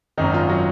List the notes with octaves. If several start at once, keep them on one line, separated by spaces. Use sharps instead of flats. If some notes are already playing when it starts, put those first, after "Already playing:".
G#1 F#2 D#3 D#4
F4
F#3 F#4